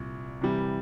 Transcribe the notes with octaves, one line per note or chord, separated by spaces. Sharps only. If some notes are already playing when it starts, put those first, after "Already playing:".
Already playing: C2 A#2
C3 E3 G3